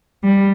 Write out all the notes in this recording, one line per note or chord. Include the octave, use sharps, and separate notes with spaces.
G3